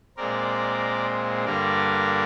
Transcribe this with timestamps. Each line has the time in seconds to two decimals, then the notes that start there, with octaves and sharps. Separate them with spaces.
0.17 A#2 G#3 C4 A#4 D5
1.45 G2 D3 G3 A#3 A#4 D5